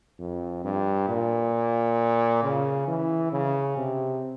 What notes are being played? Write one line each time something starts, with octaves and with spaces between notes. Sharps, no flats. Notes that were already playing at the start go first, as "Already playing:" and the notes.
F2
G2
A#2
C#3
E3
C#3
C3